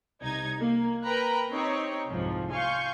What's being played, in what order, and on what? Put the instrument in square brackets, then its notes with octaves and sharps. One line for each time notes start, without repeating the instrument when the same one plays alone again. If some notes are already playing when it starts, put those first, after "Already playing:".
[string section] C2 D#4 G#6
A#3
A#4 B4 G5 A#5 B5 F#6
C4 D#4 G4 C#5
C2 F2 G#2 F3
F5 G#5 C6 C#6 G6